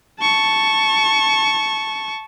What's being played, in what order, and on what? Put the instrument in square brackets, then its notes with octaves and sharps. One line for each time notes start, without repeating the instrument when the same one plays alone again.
[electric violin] A5 C#6